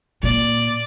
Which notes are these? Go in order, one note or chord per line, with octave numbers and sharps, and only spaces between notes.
A#2 D5